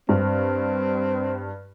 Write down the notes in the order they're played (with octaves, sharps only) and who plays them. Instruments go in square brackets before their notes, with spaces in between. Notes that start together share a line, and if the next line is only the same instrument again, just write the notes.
[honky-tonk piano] G2 [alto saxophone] C4